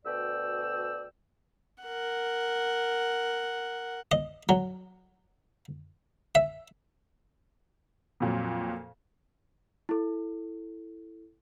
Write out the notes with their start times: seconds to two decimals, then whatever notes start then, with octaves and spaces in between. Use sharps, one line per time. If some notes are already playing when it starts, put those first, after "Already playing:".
0.05 D2 B2 D5 G5 E6
1.83 A#4 F#5
4.11 D#5
4.49 F#3
6.35 E5
8.20 F2 A#2 F#3
9.89 E4 A4